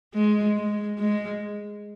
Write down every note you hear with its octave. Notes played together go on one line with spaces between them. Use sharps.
G#3
G#3
G#3